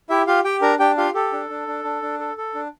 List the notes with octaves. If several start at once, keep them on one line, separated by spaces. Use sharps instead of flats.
E4 G4 E5
F4 G4 F5
G4 G5
D4 A#4 A#5
D4 G4 G5
F4 G4 F5
G4 A4
D4
D4
D4
D4
D4
A4
A4
D4